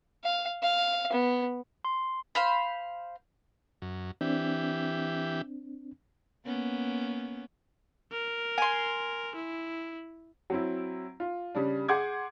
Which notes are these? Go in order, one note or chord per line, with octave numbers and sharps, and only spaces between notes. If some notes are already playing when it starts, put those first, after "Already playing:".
F5
F5
B3
C6
C5 F5 B5
F#2
E3 C4 D4 G4
A#3 B3 C#4
A#4
G#5 C6
E4
F#3 C4 E4
F4
C#3 G3 D4
G#4 F#5 C6 D6 G6 G#6